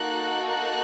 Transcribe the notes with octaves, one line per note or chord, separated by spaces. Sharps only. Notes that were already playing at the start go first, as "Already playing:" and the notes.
Already playing: A#3 D#4 F#4 A4 F#6
F#6